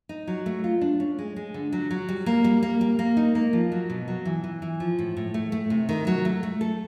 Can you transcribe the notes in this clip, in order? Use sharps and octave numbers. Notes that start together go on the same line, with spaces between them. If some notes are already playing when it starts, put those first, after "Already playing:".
D#4
F#3
A3
F4
D4
C#4
G#3
G#3
D3
F#3
F#3
G3
A#3
G3
A#3
G3
A#3
D#4
A#3
F3
F#3
B2
F#3
E3
E3
E3
F3
A2
A2
A3
A3
C3
D#3
F#3
A3
A3
A4